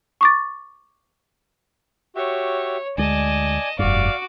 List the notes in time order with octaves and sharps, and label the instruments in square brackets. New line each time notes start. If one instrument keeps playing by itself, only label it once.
[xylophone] C#6 D6 A6
[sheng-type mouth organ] F#4 G4 E5 [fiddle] C#5
[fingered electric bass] D2 G#3 [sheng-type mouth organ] D5 G#5 [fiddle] D#5 A5
[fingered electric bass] F1 G2 [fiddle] F#4 D6 [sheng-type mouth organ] D5 F5